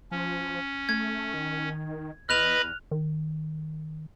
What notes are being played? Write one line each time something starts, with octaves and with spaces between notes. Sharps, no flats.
F3 C#4
A3 G#6
D#3
E2 B4 D#5 B5 F6 F#6 F7
D#3